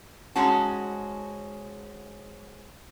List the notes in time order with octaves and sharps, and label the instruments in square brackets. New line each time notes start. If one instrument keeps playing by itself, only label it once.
[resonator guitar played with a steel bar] G#2 G#3 C#4 F#4 A5